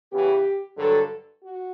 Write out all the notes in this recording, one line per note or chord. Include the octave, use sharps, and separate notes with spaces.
C#3 E3 B3 G4
G2 D3 F#3 A4
F#4